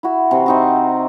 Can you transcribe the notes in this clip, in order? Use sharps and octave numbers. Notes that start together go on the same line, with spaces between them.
E4 F#4
C3 E3
C4 D#4 F#4